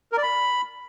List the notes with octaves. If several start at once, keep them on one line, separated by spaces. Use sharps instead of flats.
A#4
D5
B5